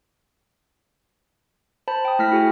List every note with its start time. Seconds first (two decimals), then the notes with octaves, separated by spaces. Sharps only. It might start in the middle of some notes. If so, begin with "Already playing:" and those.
1.88 C5 A5 B5
2.05 G5 D#6
2.19 A3 E4 F6 A#6 B6
2.32 E4 F#4 G#4 G5 G#5